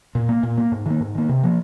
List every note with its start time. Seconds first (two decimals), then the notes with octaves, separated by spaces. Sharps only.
0.15 A#2
0.29 A#3
0.43 A#2
0.58 A#3
0.72 G#2
0.86 D#3 A#3
1.00 G#2
1.15 D#3 A#3
1.29 C3
1.43 F3 A#3